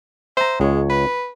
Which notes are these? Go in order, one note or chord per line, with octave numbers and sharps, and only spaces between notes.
C5 E5 A#5
C#2 G#3 C#5
B4